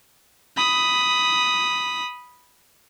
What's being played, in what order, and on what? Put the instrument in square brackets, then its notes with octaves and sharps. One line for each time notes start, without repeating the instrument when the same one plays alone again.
[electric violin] B5 D#6